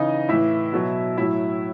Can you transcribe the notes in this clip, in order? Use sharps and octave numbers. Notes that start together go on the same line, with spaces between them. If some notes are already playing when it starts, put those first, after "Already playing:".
Already playing: C#3 E3 D#4 D#5
A2 E3 E4 E5
B2 F#3
A2 F#3 E4 E5